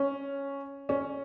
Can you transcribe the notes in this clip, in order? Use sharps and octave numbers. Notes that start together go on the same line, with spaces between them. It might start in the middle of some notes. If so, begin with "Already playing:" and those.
Already playing: C#4
C#4